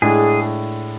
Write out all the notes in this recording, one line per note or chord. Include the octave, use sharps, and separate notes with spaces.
A2 G#3 D4 G#4